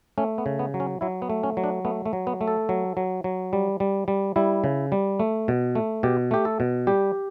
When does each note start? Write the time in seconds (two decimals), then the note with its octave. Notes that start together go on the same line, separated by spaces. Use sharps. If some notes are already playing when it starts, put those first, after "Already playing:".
0.18 A3 C#4
0.38 B3
0.46 C#3
0.59 B3
0.74 F#3
0.80 C#4
1.01 F#3 E4
1.22 B3
1.30 A3
1.43 C#4
1.57 F#3
1.64 D4
1.85 A3 B3
2.06 A3
2.13 F#3
2.27 B3
2.41 A3
2.48 A4
2.69 F#3
2.97 F#3
3.24 F#3
3.53 G3
3.80 G3
4.08 G3
4.36 G3 E4
4.64 C#3
4.92 G3
5.20 A3
5.48 B2
5.75 A3
6.03 B2 G4
6.31 A3 G4
6.45 A4
6.60 B2
6.87 G3 G4